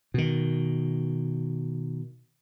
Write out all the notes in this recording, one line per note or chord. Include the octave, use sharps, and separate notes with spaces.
B2 D#3